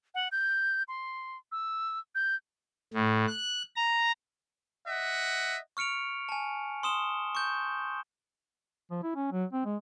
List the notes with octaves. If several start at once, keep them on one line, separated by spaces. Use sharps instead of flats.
F#5
G6
C6
E6
G6
A2
F#6
A#5
D#5 E5 F#5
C#6 F6 C#7 D7 F7
G#5 A5
C6 D#6 E7 G7
C#6 G6
F3
E4
C#4
F#3
C4
G#3